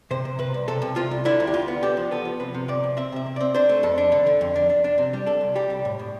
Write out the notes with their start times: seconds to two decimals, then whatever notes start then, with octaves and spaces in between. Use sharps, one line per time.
0.11 C3 C5
0.25 C3
0.39 C3 B4
0.54 C2
0.68 C3 A4
0.82 C3
0.96 C3 F4
1.11 C2
1.25 D3 E4
1.40 D2
1.47 G4
1.54 D2 F4
1.68 B3
1.83 D3 G4
1.97 F3
2.11 B3 A4
2.25 F3
2.40 C3 B4
2.54 C3
2.68 C3 D5
2.84 C3
2.97 C4 E5
3.12 C3 E5
3.26 C3
3.36 C4 D5
3.55 D4 C5
3.69 A3
3.83 F2 A4
3.98 D4
4.12 D3
4.27 D3
4.41 F2
4.56 D4
4.70 D4
4.84 D4
4.98 C3
5.13 G3
5.26 D4 A4
5.41 C2
5.55 G3 G4
5.70 C2
5.85 A2
5.99 A2